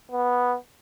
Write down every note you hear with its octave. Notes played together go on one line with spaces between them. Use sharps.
B3